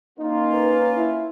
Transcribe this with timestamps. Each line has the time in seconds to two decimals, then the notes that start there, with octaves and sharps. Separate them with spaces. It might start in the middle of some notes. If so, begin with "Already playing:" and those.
0.19 A#3 C#4 D#4 F4
0.52 B4
0.97 E4